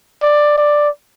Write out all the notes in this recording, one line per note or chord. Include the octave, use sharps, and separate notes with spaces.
D5
D5